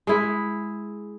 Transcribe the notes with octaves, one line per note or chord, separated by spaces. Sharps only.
G#3 E4